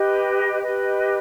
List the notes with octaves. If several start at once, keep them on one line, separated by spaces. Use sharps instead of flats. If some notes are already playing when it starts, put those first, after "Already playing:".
Already playing: G4 B4 D#5
G4 B4 D#5